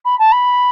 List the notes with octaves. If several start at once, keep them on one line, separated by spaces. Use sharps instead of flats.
B5
A5
B5